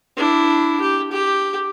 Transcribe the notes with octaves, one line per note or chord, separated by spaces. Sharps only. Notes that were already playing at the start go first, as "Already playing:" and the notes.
D4 E4
G4
G4